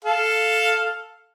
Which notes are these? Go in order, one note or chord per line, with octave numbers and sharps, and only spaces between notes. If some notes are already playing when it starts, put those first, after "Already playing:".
A4 F5